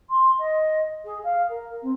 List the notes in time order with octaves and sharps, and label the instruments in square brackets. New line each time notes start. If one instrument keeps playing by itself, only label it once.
[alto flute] C6
D#5
G#4
F5
A#4
C4